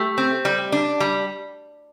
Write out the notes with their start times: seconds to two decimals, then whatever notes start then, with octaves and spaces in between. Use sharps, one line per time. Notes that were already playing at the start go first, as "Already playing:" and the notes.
Already playing: A3 G4
0.18 C4
0.45 G3
0.72 D4
1.00 G3